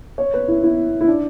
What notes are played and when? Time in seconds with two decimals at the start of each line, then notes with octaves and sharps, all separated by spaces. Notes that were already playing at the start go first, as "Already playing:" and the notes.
0.18 C#5
0.34 B4
0.48 E4
0.63 E4
1.01 E4
1.08 D4